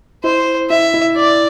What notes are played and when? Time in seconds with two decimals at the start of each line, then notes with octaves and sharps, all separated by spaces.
0.24 E4 C5
0.70 E4 E5
0.94 E4
1.17 D5